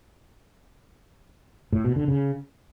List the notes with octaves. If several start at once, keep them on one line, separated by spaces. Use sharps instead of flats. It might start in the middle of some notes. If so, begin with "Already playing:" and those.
A2
B2
D3
C#3